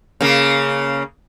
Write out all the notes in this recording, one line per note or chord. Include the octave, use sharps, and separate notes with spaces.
C#3 A#3